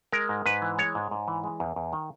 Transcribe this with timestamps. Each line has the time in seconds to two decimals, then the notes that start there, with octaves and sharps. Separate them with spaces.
0.12 G#3 A#4
0.29 G#2
0.46 G#2 B4
0.62 E3
0.78 G#3 C#5
0.95 G#2
1.11 G#2
1.28 E3
1.44 G#3
1.60 E2
1.76 E2
1.93 D#3